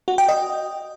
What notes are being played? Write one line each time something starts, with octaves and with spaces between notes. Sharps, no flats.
F#4
G5
D#5